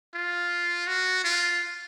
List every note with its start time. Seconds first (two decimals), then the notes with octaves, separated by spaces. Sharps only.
0.15 F4
0.87 F#4
1.24 F4